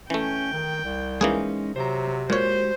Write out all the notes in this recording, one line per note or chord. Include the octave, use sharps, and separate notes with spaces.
E3 A3 C#4 G5
D#3
C2
E3 G#3 A#3 C#4 D#4 G#4
C3 F#3 C5 A#5
A#2 G#3 F#4 G4 C5 C#5